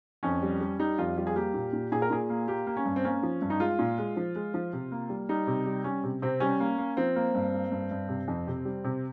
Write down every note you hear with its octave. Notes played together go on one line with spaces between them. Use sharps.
F2 C#4
G3
G3
G3 D#4
F2 F4
G3 F4
G#4
A#3 G4
A#2
A#2
A#2 G#4
A#4
A#2 G#4
A#3
A#3 G4
A#3
C#4
G2
C4
A#3 C#4
F3
G2
D#4
G#3 F4
A#2
G#3
F3
G#3
F3
C3
A#3
G3
G3 D#4
C3
G3
G3 C#4
C3
C3 C4
G3 C#4
A#3
A#3
F3 C4
A#3
G2
A#3
G2
G2
C3
F2
C3
G3
C3